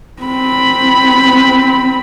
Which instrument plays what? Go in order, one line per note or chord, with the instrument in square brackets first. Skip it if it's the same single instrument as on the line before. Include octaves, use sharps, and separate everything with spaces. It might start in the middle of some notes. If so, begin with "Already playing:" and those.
[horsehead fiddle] C4 B5